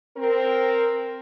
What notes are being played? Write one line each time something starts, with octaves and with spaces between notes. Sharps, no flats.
C4 A#4